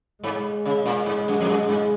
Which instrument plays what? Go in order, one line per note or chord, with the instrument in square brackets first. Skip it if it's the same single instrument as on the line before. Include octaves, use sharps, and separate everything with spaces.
[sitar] G#2 [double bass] G#3
[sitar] C#3
A#2
G#2
F#2
F2
F#2
G#2